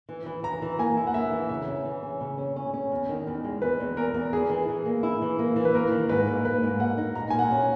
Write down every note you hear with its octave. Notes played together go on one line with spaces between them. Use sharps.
E3
E3
E3 A#5
E3
A#3 G#5
E4
F#5
A#3 E5
E3
C#3 E5
C#4
E3
C#4
C#3
C#4
C#4
C#4
E2
D#3
E2
G#3
E2 B4
E2
E2 A#4
E2
E3 G#4
E3
E3
A#3
E4
E3
A#3
E3
B4
A#3 A#4
D#3
G#2 B4
A#3
A#3 B4
G#2
A#3 F#5
D#4
A#2 A#5
A#2 G#5
F#5
C#4